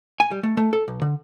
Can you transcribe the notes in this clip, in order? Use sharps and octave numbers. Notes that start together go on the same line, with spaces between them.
G#5
G3
A3
A3
A4
B1
D3